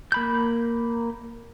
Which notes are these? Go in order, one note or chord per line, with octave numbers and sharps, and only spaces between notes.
A#3 B5 G6